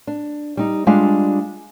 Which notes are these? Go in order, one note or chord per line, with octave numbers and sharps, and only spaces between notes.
D4
G3 D#4
G3 G#3 D4 F4 F5